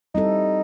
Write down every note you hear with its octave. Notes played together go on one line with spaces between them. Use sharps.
G3 C4 D#4 E4 A4